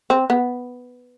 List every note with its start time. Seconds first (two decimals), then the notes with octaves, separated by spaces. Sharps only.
0.10 C4
0.30 B3